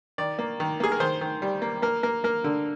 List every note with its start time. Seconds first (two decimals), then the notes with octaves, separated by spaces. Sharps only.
0.18 D#3 D5
0.39 A#3
0.60 D#3
0.80 A#3 G#4
0.92 A#4
1.00 D#3 C5
1.21 D#3
1.42 G3
1.62 A#3
1.82 A#3 A#4
2.03 A#3 A#4
2.24 A#3 A#4
2.44 D3